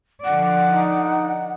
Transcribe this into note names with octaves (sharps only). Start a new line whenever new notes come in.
D3 F3 D5 F#5
D#4